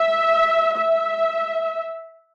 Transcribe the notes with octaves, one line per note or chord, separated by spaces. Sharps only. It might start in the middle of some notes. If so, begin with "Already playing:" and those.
Already playing: E5
E5